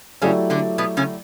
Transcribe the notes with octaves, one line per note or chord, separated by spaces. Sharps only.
C#3 F#3 A3 C#4 E4 G4 D5
D3 D4
B2 B3
C#3 C#4